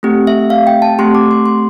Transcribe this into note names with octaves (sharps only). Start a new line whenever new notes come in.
A3 C4 G4
E5
F5
G5
A5
A3 C4 G4 C6
D6
C6
C6